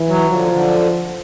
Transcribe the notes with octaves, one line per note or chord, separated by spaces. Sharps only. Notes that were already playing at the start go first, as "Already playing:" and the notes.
Already playing: E3
F#3
D3 F3
D3